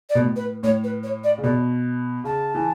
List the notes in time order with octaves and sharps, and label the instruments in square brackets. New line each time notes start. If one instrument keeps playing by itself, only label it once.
[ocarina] D5
[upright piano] B2
A2
[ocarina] B4
[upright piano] A2 [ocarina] C#5
[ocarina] B4
C#5
D5
[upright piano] C#3
[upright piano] B2 [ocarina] D5
[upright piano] C#3 [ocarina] A5
[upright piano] E3